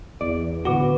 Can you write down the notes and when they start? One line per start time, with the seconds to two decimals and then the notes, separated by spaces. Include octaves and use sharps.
0.21 E2 D5
0.65 D1 B3 F#4 D6 G7